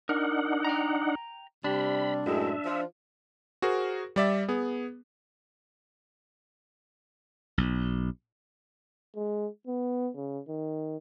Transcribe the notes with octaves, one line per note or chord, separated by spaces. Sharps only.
D4 D#4 A#4 F#5
G5 A#5
C3 G3 D4 B5
F#2 A2 G#3 E5
F3
F#4 G#4 A#4 C5
G3 D5 E5
B3 G#4
B1
G#3
B3
C#3
D#3